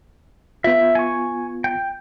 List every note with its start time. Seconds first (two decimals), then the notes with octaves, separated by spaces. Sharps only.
0.64 B3 F4 E5
0.95 G#5 C#6
1.64 G5